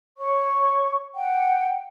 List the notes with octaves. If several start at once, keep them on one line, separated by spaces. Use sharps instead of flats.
C#5 C#6
F#5 G5